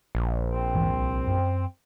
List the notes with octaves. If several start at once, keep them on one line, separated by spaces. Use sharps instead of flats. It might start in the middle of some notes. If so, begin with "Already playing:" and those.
A#1
C4
E2 G#2 E3
C2
F#2